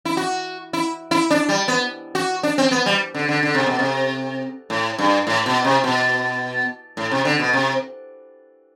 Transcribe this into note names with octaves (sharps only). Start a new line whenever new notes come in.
E4
F#4
E4
E4
D4
G3
B3
F#4
D4
C4
B3
G3
D3
D3
D3
C3
B2
C3
A2
G2
A2
B2
C3
B2
A2
C3
D3
B2
C3